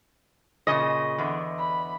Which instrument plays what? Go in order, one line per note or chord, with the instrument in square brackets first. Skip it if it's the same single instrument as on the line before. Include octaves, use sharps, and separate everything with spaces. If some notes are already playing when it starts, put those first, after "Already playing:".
[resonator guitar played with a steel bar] A#2 C#3 [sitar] D#5
[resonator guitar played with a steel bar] E2 D3 B3
[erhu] B5